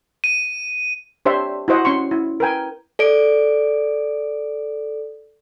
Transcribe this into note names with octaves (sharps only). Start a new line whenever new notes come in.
D#7
D4 G4 C5 C#5 E5 C6
E4 F#4 C5 D#5 F#5
C#4 C6 C#6
E4
A#4 B4 G5 G#5
A4 D5 D7